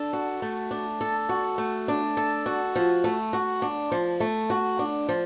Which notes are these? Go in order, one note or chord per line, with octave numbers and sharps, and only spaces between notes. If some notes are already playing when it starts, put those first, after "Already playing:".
Already playing: D4 A4
F#4
A3
D4
A4
F#4
A3
D4
A4
F#4
F3
A3
F#4
D4
F3
A3
F#4
D4
F3